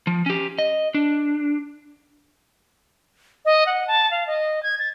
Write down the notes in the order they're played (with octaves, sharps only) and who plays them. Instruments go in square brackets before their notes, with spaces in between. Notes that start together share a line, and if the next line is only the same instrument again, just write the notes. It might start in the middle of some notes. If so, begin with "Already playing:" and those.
[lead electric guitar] F3
C#4 G4
D#5
D4
[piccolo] D#5
F#5
A5
F5
D#5
G#6
A6